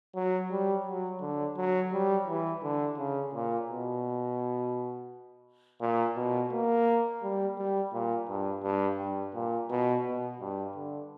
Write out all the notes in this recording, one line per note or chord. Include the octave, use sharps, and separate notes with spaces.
F#3
G3
F#3
D3
F#3
G3
E3
D3
C#3
A#2
B2
A#2
B2
A#3
G3
G3
A#2
G2
G2
G2
A#2
B2
B2
G2
D3